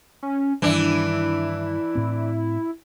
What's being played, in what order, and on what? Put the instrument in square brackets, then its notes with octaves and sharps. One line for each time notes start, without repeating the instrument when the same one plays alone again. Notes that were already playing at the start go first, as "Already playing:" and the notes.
[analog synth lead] C#4
[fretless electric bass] G2 D#3 G3 [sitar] E3 D4 [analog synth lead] E4
[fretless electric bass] A2 C4